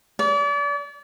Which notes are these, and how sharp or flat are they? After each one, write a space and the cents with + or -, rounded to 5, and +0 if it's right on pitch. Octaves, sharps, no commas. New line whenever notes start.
D5 -35